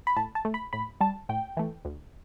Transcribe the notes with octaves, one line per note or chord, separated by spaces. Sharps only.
B5
A2 A5
A5
A3
B5
A2 B5
G3 A5
A2 G5
E3 A3
D2